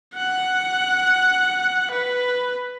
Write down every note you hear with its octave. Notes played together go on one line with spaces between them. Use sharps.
F#5 F#6
B4